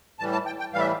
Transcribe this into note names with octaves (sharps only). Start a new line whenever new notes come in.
A2 E3 G3 A5
A5
G5
G5
A2 E3 G3 F5
E5